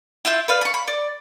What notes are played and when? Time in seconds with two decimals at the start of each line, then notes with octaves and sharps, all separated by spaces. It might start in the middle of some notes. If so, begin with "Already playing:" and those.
0.25 E4 F4 E5 G6
0.48 B4 D5 F5
0.61 B5 C#6
0.74 B5
0.88 D5